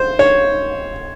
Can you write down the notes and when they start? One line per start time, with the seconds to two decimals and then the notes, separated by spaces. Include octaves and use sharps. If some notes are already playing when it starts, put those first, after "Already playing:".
Already playing: C5
0.19 C#5